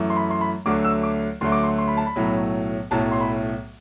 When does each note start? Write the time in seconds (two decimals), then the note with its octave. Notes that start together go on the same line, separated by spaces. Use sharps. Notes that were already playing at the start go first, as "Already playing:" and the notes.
Already playing: F#2 E3 A3
0.10 C6
0.16 B5
0.30 C6
0.41 B5
0.66 D2 D3 F#3 A3 D6
0.84 E6
1.03 D6
1.41 D2 D3 F#3 A3 C6
1.52 D6
1.63 C6
1.78 C6
1.88 B5
1.97 A5
2.06 B5
2.16 B1 A2 F#3 A3
2.91 B1 A2 F#3 A3 A5
3.11 C6
3.20 B5